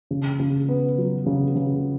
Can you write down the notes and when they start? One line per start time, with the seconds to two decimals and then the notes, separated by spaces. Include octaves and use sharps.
0.11 C#3
0.39 C#3
0.69 B3
0.98 F#3
1.26 C#3
1.55 C#3